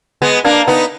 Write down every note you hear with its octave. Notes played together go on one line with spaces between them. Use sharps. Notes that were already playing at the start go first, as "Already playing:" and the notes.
G#3 B3
A#3 D4
B3 D#4